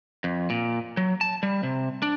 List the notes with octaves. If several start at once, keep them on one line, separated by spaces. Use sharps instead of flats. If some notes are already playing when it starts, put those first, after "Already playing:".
F2
A#2
F#3
A5
G3
C3
D4